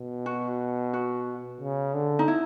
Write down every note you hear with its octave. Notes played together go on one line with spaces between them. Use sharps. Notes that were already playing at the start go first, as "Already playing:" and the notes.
Already playing: B2
F#4
F#4
C#3
D3
D#4
E4